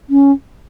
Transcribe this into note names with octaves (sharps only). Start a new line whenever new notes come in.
C#4